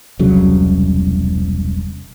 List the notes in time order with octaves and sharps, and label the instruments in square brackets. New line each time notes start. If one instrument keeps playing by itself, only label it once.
[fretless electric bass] E1 C2 C#3 F#3